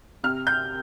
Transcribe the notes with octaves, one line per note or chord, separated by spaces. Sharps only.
C3 F6
G6